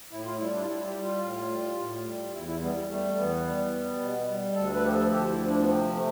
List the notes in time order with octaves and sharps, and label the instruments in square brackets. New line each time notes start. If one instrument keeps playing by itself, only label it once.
[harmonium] A2 E4
F4
G3 E4
D4
F4
G3 E4
G4
G3
F4
A2
G3
A2
G3
E2 E4
E4
G3 B3
G3
G3 A3
E2 B3
G3
G3
B2
G3
D2 A4
B4
F3 G4
A4
D2 G4
E4
F3
D4
B3
C3 C4
A3